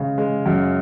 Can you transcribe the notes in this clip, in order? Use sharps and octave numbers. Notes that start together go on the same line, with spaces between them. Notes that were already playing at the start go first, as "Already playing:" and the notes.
Already playing: C#3 G#3
G#3
F#2